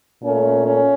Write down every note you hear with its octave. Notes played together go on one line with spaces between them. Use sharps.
A#2 A3 C#4
C#4